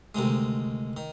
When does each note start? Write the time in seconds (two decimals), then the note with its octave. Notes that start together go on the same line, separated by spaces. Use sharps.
0.15 D2 C3 D#3 G#3
0.97 D#3